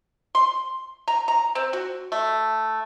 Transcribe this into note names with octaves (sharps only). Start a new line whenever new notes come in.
C6
A#5
A#5
C4
F#4
A3